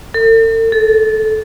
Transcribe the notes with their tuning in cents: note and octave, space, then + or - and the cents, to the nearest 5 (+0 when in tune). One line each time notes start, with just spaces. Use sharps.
A4 +45
A4 -20